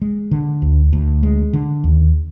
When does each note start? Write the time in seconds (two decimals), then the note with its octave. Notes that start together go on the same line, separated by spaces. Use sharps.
0.02 G#3
0.31 D3
0.62 D2
0.93 D2
1.23 G#3
1.53 D3
1.84 D#2